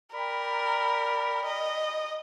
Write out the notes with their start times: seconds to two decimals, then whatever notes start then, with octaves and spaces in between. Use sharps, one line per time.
0.14 A#4 D5 G5 B5
1.45 D#5